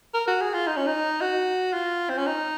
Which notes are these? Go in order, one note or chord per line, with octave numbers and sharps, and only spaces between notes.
A#4
F#4
G#4
F4
D#4
C#4
D#4
F#4
F4
C4
C#4
D#4